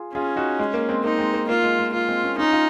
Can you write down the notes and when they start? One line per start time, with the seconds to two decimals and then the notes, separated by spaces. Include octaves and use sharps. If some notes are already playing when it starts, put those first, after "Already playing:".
Already playing: F4 G#4
0.14 C#4 F4 G#4
0.36 D#4 F#4
0.59 G#3
0.74 A#3
0.89 G#3 C4
1.03 A#3 D#4
1.18 G#3 C4
1.34 A#3
1.49 A#3 F4
1.63 G#3
1.79 G#3
1.93 A#3 F4
2.08 G#3 C4
2.24 A#3 C#4
2.38 C#4 D#4 F4
2.53 C#4 F4